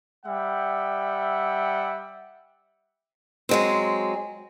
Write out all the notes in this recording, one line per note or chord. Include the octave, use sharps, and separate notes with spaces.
G3 E5 F#5 G5
F#3 G#3 C4